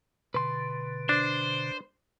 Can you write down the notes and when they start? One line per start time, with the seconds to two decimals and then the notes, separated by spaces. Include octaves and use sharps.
0.34 B2 D3 B4 C6
1.09 D4 C5